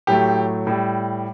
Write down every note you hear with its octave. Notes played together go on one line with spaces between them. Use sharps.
A2 F#3 A3 G4
A2 G3